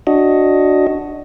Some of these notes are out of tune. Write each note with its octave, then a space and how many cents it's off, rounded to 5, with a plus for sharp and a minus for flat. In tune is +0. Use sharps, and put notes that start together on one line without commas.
D4 +0 F#4 +0 D#5 +10